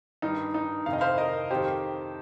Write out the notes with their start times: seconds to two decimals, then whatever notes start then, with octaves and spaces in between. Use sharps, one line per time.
0.22 G2 D#3 D#4
0.54 D#4
0.86 F2 C3 D#3 F5
0.93 D#5
1.01 C5 F5
1.18 A#4 D#5
1.50 F2 D#3 G4 C5